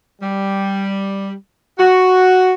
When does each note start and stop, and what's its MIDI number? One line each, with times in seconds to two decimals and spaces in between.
0.21 1.33 55
1.79 2.54 66